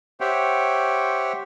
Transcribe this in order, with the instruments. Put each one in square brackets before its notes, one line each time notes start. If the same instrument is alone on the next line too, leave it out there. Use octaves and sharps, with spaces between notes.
[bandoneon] G4 C5 C#5 E5 F#5 G5